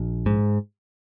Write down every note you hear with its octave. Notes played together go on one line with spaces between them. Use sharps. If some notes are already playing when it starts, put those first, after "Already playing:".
Already playing: A#1
G#2